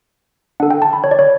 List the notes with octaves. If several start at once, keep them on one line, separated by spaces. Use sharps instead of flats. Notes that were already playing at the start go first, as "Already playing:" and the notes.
D4 A4 F#5
G5
A5
B5
C#5
D5
C#5